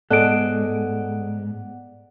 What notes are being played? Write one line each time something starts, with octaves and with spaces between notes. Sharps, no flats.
G#2 G#3 B3 A4 D5 F#5 F#6 D7